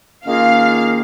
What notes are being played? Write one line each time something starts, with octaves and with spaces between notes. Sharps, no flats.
D#3 A#3 C#4 F4 G#4 F5